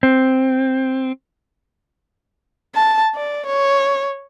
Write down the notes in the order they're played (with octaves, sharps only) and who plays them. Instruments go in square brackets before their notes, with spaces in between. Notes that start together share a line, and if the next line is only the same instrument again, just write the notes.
[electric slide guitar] C4
[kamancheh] A5
D5
C#5